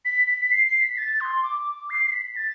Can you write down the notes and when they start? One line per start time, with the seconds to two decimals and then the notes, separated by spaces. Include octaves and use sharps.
0.05 B6
0.27 B6
0.45 B6
0.51 C7
0.67 C7
0.81 B6
0.98 A6
1.21 C6
1.43 D6
1.90 C7
2.05 C7
2.12 B6
2.36 A6